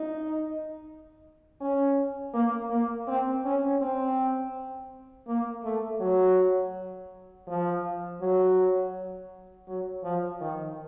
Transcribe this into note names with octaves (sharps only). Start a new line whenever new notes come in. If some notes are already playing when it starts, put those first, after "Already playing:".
Already playing: D#4
C#4
A#3
A#3
C4
C#4
C4
A#3
A3
F#3
F3
F#3
F#3
F3
D#3